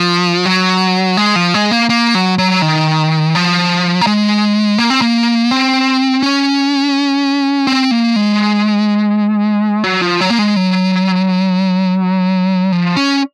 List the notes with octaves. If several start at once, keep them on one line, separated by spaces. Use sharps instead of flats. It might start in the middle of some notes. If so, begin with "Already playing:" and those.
Already playing: F3
F#3
G#3
F3
G#3
A#3
A#3
F#3
F#3
D#3
F3
A#3
G#3
A#3
C4
A#3
C4
C#4
C4
A#3
G#3
F#3
F3
F#3
A#3
G#3
F#3
F3
C#4